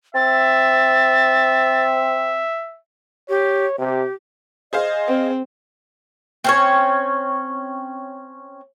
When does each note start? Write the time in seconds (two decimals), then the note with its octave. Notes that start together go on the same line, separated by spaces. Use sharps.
0.15 C4 E5 A6
3.29 G4 C#5
3.78 C3 G4
4.73 G#4 C5 D#5 F5
5.07 C4
6.44 C4 C#4 C#5